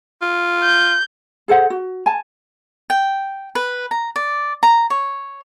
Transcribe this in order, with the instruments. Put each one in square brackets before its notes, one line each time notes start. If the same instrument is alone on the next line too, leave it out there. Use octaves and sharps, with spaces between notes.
[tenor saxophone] F4
[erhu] G6
[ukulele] G#4 A4 C5 F#5
F#4
G#5 A5
[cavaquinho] G5
B4
A#5
D5
A#5
C#5